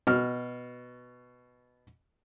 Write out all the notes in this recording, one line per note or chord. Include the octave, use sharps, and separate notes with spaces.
B2 F6